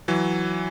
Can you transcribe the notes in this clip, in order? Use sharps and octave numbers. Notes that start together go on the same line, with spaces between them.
E3 F#3